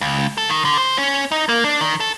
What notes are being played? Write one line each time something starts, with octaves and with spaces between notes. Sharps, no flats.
C#2
A4
D#3
D3
C5
C#4
D#4
A#3
D4
D#3
A4